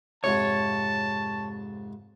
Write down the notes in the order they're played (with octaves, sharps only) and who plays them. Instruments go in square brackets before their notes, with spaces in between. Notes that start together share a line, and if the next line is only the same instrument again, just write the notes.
[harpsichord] F2 G#2 C3 [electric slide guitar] C#5 [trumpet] A5